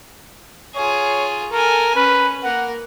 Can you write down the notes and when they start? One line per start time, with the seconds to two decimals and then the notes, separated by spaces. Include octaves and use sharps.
0.76 F4 G#4 C#5
1.53 A4 A#4 G#5
1.96 C#4 B4
2.44 A#3 A#4 F#5